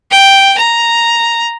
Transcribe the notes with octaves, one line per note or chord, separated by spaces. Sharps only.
G5
A#5